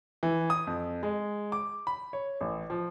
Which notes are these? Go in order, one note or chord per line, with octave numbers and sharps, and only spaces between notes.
E3
D#6
F2
G#3
D6
B5
C#5
A1
F3